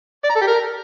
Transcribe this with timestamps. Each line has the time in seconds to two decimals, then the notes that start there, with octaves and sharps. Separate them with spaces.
0.24 D5
0.30 A#5
0.36 A4
0.41 G4
0.47 A#4